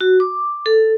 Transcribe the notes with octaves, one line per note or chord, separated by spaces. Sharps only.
F#4
D6
A4